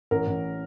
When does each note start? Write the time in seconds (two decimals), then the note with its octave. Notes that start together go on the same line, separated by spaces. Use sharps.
0.11 A1 A#4
0.27 A1